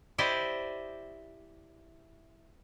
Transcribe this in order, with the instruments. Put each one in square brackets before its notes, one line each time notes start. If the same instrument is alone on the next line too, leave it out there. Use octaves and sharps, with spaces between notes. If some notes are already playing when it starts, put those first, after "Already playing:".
[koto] E4 G4 C5 D5 D#5